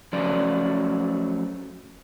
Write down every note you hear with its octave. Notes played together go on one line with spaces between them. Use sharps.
F3 F#3 A3 C#4 D5